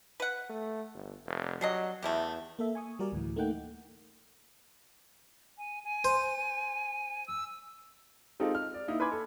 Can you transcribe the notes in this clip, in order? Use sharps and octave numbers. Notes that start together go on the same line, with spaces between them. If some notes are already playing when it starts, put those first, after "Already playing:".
B4 F#5
A3
G1
F1
F#3 G3 D4 D#5
E2 A3 E4 G4
A#3 A4 E5
G#5 C#6 D#6
G3 F#4 A#4 D5
D2 A2 E3
A3 A#3 D#4 F#5 G5
G#5
G#5
C5
E6
G#3 C4 D#4 F4 G4 A4
F6
D5
A#3 D#4 E4
B4 G#5 B5 C6 D6 G#6
A4